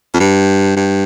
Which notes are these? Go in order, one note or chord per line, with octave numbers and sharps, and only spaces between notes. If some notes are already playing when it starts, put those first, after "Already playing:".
F2
G2
G2